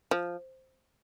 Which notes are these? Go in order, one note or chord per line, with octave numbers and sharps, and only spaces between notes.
F3